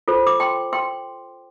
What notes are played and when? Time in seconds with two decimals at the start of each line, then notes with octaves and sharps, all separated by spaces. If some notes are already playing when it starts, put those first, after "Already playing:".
0.08 F4 A4 C5
0.27 D6
0.40 G5 C6
0.73 G5 C6